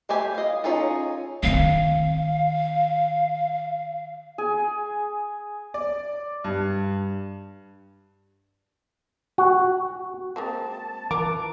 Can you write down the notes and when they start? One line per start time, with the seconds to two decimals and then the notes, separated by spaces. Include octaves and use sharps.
0.09 G#3 A3 G4 G#5 B5
0.34 D#5 F5
0.64 C#4 D#4 F4 G#4 A4
1.43 D#3 C4 F5
4.38 G#4 G#5
5.74 D5
6.44 G2
9.38 F#4
10.36 G#3 A#3 C4 A5
11.11 E3 F4 A#4 D6